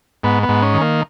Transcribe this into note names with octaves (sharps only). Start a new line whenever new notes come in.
G#2 B3
B3
G#2
C#4
D#3
A#3